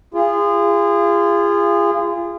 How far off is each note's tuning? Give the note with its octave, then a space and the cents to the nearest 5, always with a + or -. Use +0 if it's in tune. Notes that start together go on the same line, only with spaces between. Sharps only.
F4 -30 G#4 -30